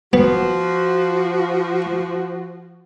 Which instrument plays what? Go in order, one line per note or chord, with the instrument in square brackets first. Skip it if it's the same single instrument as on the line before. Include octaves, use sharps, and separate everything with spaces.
[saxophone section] F3 F#4 [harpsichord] B3